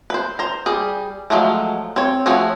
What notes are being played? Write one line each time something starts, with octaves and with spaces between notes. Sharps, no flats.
B4 C5
C5 A#5
G3 G#4
F3 F#3 G#3 A3
C4 C#5
F3 A3 F#4 G#4 C#5